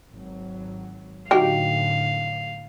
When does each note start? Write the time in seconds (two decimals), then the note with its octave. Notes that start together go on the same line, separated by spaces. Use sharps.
0.13 G#1 F#3
1.31 A2 D3 F#3 D#4 G4 F5